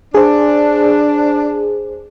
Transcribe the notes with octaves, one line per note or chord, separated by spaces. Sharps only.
D4 G#4 C5